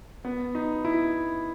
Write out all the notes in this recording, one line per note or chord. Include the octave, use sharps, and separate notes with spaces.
B3
D#4
E4